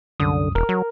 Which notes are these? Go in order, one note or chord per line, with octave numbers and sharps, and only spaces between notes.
C2 F#2 D3 D#6
E1 A#4
F#3